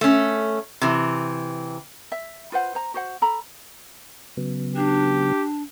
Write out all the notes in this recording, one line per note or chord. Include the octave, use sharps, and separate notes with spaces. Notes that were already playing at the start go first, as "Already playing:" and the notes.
A3 C#4
C3 E3
E5
F4 B4 C5 F#5
C5 A#5
F#4 C5 F#5
A4 A#5 B5
C#3 F#3 B3
D4 G4